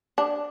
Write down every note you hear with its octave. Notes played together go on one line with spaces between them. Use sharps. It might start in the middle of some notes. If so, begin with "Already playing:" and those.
D4